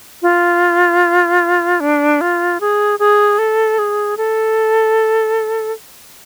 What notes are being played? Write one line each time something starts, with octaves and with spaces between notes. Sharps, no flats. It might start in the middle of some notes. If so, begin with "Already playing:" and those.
F4
D4
F4
G#4
G#4
A4
G#4
A4